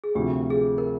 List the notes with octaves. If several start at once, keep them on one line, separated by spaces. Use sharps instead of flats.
G#4
D2 C3 F3 G4
G#4
A#4